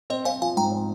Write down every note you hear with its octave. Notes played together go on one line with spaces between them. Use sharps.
C4 C5 D#5
C4 F5 G#5
F3 F5 G#5
G#2 G5 A#5
C4